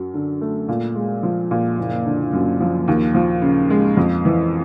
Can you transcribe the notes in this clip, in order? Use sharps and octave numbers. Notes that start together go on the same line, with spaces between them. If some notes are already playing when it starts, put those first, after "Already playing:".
Already playing: F#2 F#3
D3
A3
A#2
G#3
F3
A#2
F#1
D3
F#2
F3
D#2
F3
C#3
G#3
F2
E3